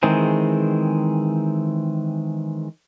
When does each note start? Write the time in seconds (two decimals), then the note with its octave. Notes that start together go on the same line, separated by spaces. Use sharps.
0.03 D#3 E3 G#3 C4 G#4